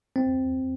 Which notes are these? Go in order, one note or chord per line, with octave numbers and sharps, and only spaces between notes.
C4